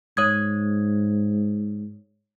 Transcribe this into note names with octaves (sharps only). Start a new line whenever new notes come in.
G#2 C#5 D#6 G#6